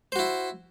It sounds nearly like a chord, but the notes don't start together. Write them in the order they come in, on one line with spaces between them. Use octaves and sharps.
C5 F#4 E4